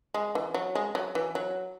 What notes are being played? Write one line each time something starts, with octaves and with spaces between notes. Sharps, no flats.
G#3
E3
F#3
G#3
F#3
E3
F#3